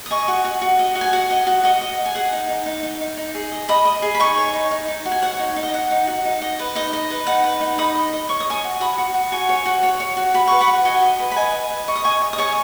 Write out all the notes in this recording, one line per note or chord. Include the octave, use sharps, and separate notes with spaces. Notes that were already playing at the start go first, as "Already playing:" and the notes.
D#6
D#5 G#5 C#6
F#4
F#4
F#4
D#5
F#4
G#5
F#4 F#5
D#5
F#4
F#4 D#5
D#5
D#5
G#5
G#4 F#5
D#4
D#4
D#4
D#4
D#4
D#4
G#4
D#5
D#5 B5 D#6
D#5
G#4
B5
D#4 G#5 C#6
C#5
D#4
D#4
D#4
F#4
G#5
C#5 F#5
D#4
D#4
D#5
D#4 F#5
D#4
F#4
D#4
D#5
B4
D#4 D#5
D#5
B4
D#4 F#5
B4
D#4
D#4 B5 D#6
D#5
D#5
C#5 C#6
D#6
C#5 G#5 C#6
F#4
F#4 B5 D#6
F#4
F#4
F#4 G#5 C#6
C#5
F#4
C#5
C#5
F#4
F#4 B5
B4 C#6
F#5 B5
F#4
F#4 D#5 G#5
D#5
B4
B5
B4 D#5 G#5
D#5
B4
D#5 C#6
D#6
D#5 G#5 C#6
D#5
D#6
C#5 G#5 C#6